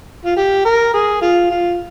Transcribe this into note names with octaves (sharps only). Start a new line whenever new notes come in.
F4
G4
A#4
G#4
F4
F4